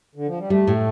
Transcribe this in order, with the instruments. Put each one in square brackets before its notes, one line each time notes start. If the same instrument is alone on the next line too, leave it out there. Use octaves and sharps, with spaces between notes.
[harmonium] D3
F3
G3
[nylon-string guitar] G3 [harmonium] A3
[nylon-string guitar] A2